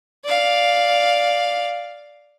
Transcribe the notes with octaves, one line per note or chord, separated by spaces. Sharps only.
D5 F5